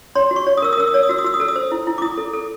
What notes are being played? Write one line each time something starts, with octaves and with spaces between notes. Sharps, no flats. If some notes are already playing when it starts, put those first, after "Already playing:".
C#5 C6
F#4
C#6
C#5
D#6
A#4 E6
D#6
A#4 E6
D#6
C#5 E6
D#6
F#4 E6
D#6
F#4 E6
D#6
A4 E6
D#6
C5
E4
E4
D6
E4 D#6
A4
A4